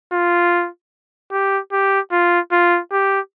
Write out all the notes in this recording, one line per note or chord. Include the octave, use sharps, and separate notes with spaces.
F4
G4
G4
F4
F4
G4